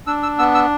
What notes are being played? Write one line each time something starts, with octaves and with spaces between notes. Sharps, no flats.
D4 E6
E6
B3 E6
E6